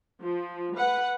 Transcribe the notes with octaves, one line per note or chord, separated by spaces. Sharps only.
F3
B4 F#5